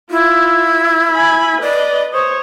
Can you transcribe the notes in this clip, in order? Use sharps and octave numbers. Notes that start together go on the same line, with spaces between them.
E4 F4
G#5 B5
B4 D5 D#5
C5 C#5 D#6